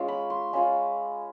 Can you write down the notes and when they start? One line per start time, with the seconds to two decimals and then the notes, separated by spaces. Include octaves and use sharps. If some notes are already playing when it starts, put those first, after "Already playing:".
Already playing: G#3 C#4 F4
0.08 B5
0.30 C6
0.53 G#3 C#4 F4 B5